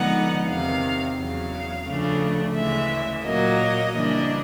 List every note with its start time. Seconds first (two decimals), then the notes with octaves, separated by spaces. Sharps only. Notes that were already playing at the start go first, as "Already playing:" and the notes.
Already playing: D3 F3 G#3 B3 D#4 F#5
0.48 E2 C3 D#3 F5
1.17 E2 C#3 F#3 F5
1.87 D2 C#3 F3 A3 D4
2.55 D2 C#3 E3 G#3 E5
3.24 A#2 F#3 A#3 D#5
3.93 C#3 E3 G3 A#3 D4